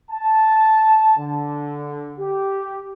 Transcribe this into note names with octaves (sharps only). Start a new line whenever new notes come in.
A5
D3
G4